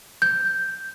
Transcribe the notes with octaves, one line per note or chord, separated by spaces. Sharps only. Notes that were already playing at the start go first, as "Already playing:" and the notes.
G6